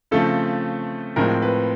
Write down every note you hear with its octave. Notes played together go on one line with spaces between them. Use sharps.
C#3 F3 A3 C4 A4
A2 F3 G#3 C4 A#4
B4